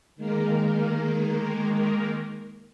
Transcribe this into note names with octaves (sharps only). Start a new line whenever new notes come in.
D#3 G#3 A#3 A#4